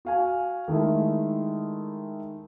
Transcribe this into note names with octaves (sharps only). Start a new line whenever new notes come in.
F#4 F5 G#5
D#3 G#3 A3 E4